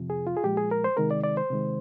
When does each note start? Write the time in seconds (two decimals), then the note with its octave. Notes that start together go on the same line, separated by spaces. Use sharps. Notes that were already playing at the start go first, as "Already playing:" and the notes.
Already playing: F2 C3 F3
0.10 G#4
0.27 F4
0.37 G#4
0.44 A#2 F3 G#3 G4
0.57 G#4
0.71 A#4
0.84 C5
0.97 C3 D#3 G#3 A#4
1.11 D5
1.23 D5
1.37 C5
1.50 C3 D#3 G#3